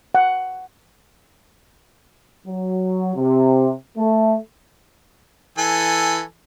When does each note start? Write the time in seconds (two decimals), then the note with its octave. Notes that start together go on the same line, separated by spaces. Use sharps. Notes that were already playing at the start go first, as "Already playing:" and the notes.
0.15 F#5
2.47 F#3
3.16 C3
3.97 A3
5.58 E3 A4 G#5